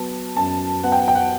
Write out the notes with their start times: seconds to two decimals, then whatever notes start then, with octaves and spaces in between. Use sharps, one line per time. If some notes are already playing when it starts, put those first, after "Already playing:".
Already playing: F#3 B3 A5
0.37 F#2 A5
0.84 B3 F#5
0.92 G5
0.99 F#5
1.08 G5
1.15 F#5